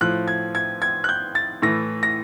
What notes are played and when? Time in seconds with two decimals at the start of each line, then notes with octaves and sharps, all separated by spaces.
0.01 A2 F3 F#6
0.28 G#6
0.55 G#6
0.82 G#6
1.04 F#6
1.09 G6
1.35 A6
1.62 A2 E3 A#6
2.03 A#6